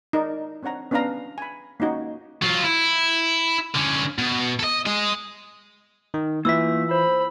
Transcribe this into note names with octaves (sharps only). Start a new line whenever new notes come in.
D#4 A#4 D5
C4 D4 C#5 F#5 A#5
B3 C#4 D4 B4 F5 A#5
G#5 B5
A#3 C#4 D#4 F#4 C#5
F#3 F4
E4
D3 C#4
B2
A4 D#5
G#4 D#5
D#3
E3 A#3 F4 E5 E6 B6
C5 B5